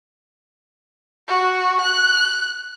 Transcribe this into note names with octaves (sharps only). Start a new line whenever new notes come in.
F#4
F#6